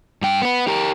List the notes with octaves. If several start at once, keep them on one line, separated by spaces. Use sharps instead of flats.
G2 G5
B3 B4
G4 A#4